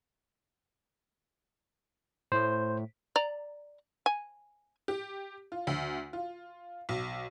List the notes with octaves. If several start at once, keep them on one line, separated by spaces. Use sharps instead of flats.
A2 C5
D5 A#5
G#5
G4
F4
D2
F4
B1